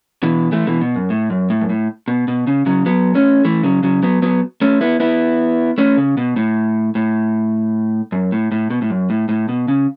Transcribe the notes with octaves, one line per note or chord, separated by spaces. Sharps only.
B2 E3
E3 A3
B2 E3
B2
F#2
A2
F#2
A2
F#2
A2
B2
B2
C#3
C#3 F#3
F#3 B3
A3 C#4
E3 A3
C#3 F#3
C#3 F#3
F#3 B3
F#3 B3
A3 C#4
B3 E4
B3 E4
A3 C#4
C#3
B2
A2
A2
F#2
A2
A2
B2
A2
F#2
A2
A2
B2
C#3